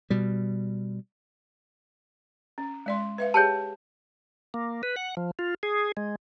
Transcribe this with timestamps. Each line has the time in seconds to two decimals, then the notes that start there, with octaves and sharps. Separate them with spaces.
0.10 B2 G3
2.58 C#4
2.86 G#3 D5 C6
3.18 B4 E5 F5
3.34 G4 G#4 C#5 G5 A5
4.54 A#3
4.83 B4
4.96 F#5
5.17 F3
5.39 F4
5.63 G#4
5.97 G#3